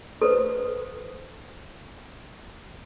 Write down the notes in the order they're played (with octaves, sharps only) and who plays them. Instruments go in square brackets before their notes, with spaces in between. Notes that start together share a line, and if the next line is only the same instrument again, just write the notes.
[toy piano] A4 B4 C5